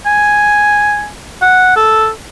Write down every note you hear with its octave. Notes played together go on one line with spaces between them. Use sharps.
G#5
F#5
A4